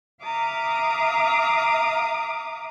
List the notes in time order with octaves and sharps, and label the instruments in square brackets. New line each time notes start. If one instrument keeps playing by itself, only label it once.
[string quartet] E5 F5 A#5 D6 D#6